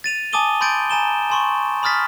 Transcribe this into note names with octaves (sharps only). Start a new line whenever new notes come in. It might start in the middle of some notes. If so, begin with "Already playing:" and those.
A6 D#7 F7
G#5 A5 D6 D#6 D#7 G7
B5 C6 G6 A6 D7
G#5 A#5 E7 G7
G#5 C6 C#6
B5 D#6 F6 A6 B6